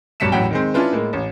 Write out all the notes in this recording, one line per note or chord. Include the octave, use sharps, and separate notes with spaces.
B1 G2 F#3 B6 C#7 E7
A1 E2 A2 F#3 F#5 G5
D#3 G#3 C4
C#4 D4 E4 F4 B4
A2 G#3 A#3
A1